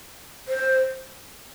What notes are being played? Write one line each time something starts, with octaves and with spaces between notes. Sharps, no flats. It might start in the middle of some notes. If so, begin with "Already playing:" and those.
C5